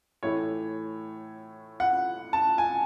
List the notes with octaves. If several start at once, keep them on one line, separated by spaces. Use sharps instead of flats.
A2 E3 A3 C#5
F#5
A5
G#5